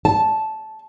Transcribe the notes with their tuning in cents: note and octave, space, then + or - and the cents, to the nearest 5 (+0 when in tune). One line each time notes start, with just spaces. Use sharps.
A5 -10